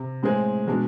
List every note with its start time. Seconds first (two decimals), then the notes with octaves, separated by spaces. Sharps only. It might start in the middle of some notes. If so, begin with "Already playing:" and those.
Already playing: C3
0.23 A2 G#3 C4 G#4
0.67 B2 G#3 D4